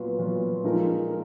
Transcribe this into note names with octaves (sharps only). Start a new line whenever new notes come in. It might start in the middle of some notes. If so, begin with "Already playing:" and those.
Already playing: A#2 F#3 B3 F4 B4
A#2 F#3 B3 F4 B4
A#2 F3 G#3 D#4 A#4
A#4